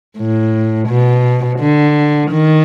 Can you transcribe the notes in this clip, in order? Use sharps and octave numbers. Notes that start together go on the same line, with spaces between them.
A2
B2
D3
D#3